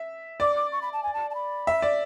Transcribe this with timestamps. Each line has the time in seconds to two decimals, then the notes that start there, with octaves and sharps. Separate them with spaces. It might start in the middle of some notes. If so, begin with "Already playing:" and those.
Already playing: E5
0.40 D5 D6
0.56 D6
0.72 C#6
0.82 B5
0.93 A5
1.03 G#5
1.14 A5
1.30 A5
1.35 B5
1.67 E5
1.82 D5